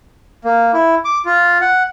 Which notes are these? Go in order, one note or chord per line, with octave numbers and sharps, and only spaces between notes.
A#3
E4
D6
F4
F#5